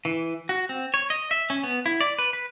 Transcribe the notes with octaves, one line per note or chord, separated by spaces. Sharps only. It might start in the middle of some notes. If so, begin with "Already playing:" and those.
E3
F#4
C4
C#5
D#5
E5
C#4
B3
E4
D5
B4
B4